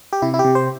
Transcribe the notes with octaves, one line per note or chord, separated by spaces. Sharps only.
G4
C3 E4
E4
G4
C3
C5